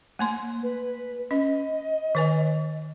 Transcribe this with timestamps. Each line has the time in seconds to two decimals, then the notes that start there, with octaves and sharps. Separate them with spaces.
0.19 A3 A#3 C6
0.63 B4
1.31 C#4 D#5
2.15 D#3 B4 G#5